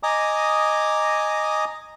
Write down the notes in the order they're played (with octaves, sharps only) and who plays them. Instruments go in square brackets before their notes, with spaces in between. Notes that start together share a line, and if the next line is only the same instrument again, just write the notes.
[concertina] D#5 G#5 A#5 D6 D#6